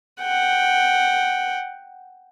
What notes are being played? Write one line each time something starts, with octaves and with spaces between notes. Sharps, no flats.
F#5 G5